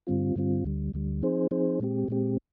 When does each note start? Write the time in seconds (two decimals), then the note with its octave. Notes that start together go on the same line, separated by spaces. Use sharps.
0.07 G2 D3 G3 C4 F4
0.36 G2 D3 G3 C4 F4
0.64 D2 D3 G3
0.94 D2 D3 G3
1.22 F3 C4 D#4 G#4 C5
1.51 F3 C4 D#4 G#4 C5
1.80 A#2 G#3 C4 G4
2.08 A#2 G#3 C4 G4